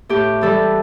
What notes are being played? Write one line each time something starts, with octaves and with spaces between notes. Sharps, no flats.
A2 G4
E3 G3 A4